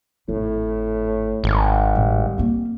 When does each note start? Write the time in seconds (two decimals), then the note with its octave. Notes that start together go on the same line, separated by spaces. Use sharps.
0.29 G#1 A2
1.44 G#1
1.95 A2 G3
2.38 A#3 C4